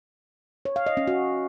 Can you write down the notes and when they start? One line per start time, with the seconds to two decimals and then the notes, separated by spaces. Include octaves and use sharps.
0.65 C#5
0.76 F5
0.86 D#5
0.97 C#4
1.08 F#4